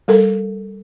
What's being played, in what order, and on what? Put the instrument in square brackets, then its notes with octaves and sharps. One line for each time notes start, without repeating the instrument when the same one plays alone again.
[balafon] G3 A4 A#4